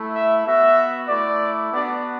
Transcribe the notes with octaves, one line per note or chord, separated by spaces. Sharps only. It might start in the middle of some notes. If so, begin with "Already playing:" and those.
Already playing: A3 E4
E5
B3 F#4 E5
A3 E4 D5
B3 D4 F#4 D5